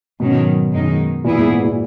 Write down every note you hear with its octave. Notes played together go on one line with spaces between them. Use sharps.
G#2 B2 D#3 F#3 C#4
F#2 D#3 G#3 D#4
A#2 E3 B3 E4 G#4
G#2
G#2
A#2